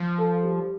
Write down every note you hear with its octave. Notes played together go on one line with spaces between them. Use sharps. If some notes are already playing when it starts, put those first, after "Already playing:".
Already playing: F3
A4
G3